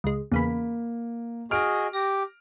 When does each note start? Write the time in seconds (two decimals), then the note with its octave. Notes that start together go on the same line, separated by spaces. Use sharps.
0.04 C#2 G#3
0.31 E2 C#3 A#3 B5
1.51 F#4 G#4 D#5 F6 D7
1.93 G4 A#6